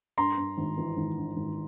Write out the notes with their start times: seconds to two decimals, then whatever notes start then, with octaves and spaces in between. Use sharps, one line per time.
0.18 G2 A#5 C6
0.38 G2
0.57 G#1
0.77 E3
0.97 G#1
1.17 G2
1.36 G#1